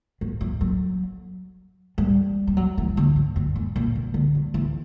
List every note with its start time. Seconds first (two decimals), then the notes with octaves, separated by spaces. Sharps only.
0.21 F#3
0.41 F#3
0.61 F#3
1.98 G3
2.47 G3
2.57 F#3
2.78 E3
2.97 D3
3.16 G2
3.36 F#2
3.56 F#2
3.76 A#2
3.96 B2
4.14 D3
4.35 F#3
4.54 E3